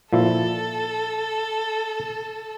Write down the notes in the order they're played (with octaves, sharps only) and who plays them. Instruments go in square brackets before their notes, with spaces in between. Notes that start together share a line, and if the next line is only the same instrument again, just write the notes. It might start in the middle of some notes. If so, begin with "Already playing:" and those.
[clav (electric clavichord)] A#2 F3 E4 [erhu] A4